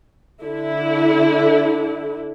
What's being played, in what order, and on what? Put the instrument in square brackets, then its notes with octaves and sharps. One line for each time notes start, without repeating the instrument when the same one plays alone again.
[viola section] D3 E4